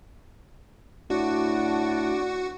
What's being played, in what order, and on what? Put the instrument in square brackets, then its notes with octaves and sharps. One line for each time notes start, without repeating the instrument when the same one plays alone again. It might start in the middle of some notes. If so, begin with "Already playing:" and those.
[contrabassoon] A2 [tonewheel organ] D4 [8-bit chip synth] F#4 F#5